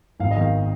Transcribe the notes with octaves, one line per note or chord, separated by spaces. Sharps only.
G#1 F5
D#5
D#3 F5